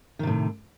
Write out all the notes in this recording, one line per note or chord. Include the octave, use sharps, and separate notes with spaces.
A2 C3 D#3